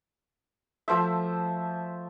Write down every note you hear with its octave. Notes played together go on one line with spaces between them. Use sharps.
F3 A3 C5 E5